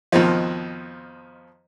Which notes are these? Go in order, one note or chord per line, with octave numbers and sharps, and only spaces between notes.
F2 B2 D#3 F3